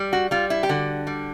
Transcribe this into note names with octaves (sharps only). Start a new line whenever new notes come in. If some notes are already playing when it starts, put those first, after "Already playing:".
Already playing: G3
F#4
G3 F4
E4
G4
D3 F#4
G3